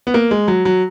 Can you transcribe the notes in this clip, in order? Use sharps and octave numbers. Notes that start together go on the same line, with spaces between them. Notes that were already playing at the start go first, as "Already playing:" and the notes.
B3
A#3
G#3
F#3
F#3